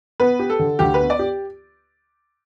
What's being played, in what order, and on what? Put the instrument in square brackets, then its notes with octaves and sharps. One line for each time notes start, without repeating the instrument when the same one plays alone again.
[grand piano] B3 [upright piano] B4
[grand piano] G4
[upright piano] A4
[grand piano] D3
[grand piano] D2 [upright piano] G4
[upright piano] B4
[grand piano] B3
[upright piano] D5
[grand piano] G4